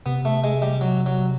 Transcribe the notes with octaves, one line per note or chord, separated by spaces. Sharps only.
C3 B3
A3
G#3
G3
F#3
F#3